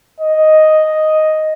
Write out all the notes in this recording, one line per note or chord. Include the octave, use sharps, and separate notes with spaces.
D#5